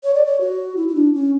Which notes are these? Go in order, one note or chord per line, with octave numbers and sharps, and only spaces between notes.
C#5
D5
C#5
F#4
E4
E4
D4
C#4